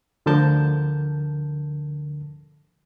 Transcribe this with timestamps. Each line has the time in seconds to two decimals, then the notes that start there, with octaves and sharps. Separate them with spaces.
0.26 D2 D3 F3 A#4 A5 G6